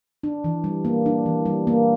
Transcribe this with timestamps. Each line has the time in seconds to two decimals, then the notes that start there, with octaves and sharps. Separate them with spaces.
0.23 D4
0.44 E3
0.64 G3
0.85 A#3
1.06 D4
1.26 E3
1.46 G3
1.67 A#3